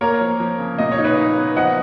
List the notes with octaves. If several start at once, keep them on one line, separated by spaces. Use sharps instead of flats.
A#3 A#4 C#5
F3
F3
C#3
A#2 D#5
C#5
D#4
B4 D#5
D#4
B3
F3 D#5 F#5